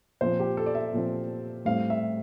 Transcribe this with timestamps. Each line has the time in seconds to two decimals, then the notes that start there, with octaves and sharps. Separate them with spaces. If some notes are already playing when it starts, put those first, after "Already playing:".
0.21 A#2 F3 C4 C5
0.40 G4
0.57 A4
0.66 D5
0.75 E5
0.93 A#2 F3 C4
1.65 A2 G3 C4 F5
1.90 E5